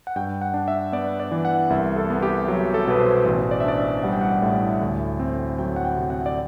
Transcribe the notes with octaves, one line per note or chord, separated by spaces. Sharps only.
F#5
G2 G5
F#5
D4
E5
B3 D5
D5
E3
F#5
C2 E5
A4
B3
G4
F#3
A4
B2 B4
C5
A1 C5
D5
E5
D4 D5
E5
G3 F#5
G5
F#5
A2
D2
C4
F#3 G5
F#5
G5
C3
F#5
D5